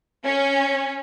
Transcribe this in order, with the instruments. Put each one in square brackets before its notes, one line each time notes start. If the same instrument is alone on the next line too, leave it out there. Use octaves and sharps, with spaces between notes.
[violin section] C#4